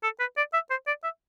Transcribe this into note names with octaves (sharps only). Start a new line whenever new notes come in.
A4
B4
D5
E5
C5
D5
E5